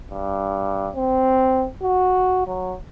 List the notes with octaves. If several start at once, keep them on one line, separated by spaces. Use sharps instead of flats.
G2
C4
F#4
F#3